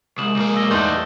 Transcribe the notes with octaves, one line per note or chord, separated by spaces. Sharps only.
C2 G#3 D#6 E7 F#7
B1 A#3
E6 A#6 G7
E2 G3 A3 D#4 C6 G6 A6 F#7